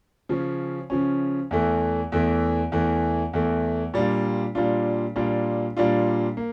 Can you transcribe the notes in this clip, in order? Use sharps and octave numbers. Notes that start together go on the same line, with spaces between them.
C#3 F3 C#4
C#3 F3 C#4
E2 E3 A3
E2 E3 A3
E2 E3 A3
E2 E3 A3
A#2 G3 D4 F4
A#2 G3 D4 F4
A#2 G3 D4 F4
A#2 G3 D4 F4
A#3